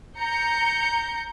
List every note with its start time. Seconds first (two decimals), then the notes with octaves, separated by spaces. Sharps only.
0.18 A#5 G6 C#7